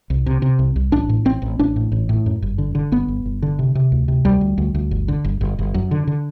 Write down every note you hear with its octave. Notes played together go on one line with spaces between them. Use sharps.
C2
C3
C3
C2
C2
A1 D4
A2
A1 C4
A1
A1 D4
A2
A1
A2
F#2
G1
D3
D3
G1 B3
G1
G1
D3
C3
C3
D2
C3
D2 G3
D2
D2
D2
G1
D3
G1
G1
G1
F#2
D3
D3